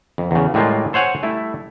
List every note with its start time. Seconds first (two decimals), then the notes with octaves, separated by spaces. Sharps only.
0.18 F2
0.31 E2 C#3
0.54 A2 G3 G#3 A#3 F4
0.93 A4 C5 C#5 F#5 G#5
1.23 G3 A3 E4